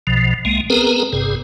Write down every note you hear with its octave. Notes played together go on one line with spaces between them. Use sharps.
B1 B2 F3
C2 G#3 A#3
B3 C4 G#4 A#4 B4 A#5
G1 G2 C3 G#4